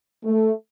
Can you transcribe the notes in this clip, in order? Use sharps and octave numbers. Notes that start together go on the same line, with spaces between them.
A3